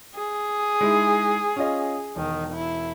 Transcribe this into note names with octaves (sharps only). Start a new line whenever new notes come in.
G#4
G#3 D#4 E4
C#4 F4 D#5
E1 D#3
E4